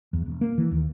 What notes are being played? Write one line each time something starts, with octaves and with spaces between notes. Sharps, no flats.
E2
E1
A#3
E3
D#2